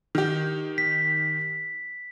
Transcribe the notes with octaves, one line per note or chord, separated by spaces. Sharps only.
D#3 G4
B6